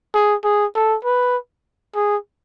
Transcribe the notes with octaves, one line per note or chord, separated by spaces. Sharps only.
G#4
G#4
A4
B4
G#4